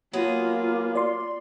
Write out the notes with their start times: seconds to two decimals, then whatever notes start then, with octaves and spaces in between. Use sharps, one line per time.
0.13 F#3 A#3 B3 F4 G#4
0.95 D5 C6